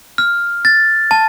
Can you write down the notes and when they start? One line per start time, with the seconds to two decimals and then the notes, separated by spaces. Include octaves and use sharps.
0.18 F6
0.65 A6
1.11 A5